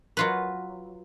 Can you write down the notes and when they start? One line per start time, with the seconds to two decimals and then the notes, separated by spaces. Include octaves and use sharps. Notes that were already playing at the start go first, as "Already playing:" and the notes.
0.17 F#3 F4 B4